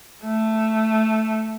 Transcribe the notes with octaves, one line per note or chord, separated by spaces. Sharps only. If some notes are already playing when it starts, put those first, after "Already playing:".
A3